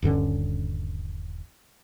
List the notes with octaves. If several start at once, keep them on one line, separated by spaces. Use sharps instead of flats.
D#1 G2 D3 C#4